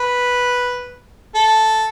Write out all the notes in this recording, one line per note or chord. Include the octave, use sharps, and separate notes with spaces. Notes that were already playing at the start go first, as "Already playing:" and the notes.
Already playing: B4
A4